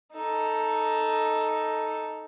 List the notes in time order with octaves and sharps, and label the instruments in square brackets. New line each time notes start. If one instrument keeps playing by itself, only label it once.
[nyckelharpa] D#4 A4